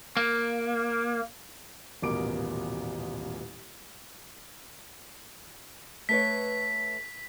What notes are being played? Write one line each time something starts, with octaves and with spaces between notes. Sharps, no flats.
A#3
D#1 A1 B2 A#4 D6 D7
A3 B4 C#5 B6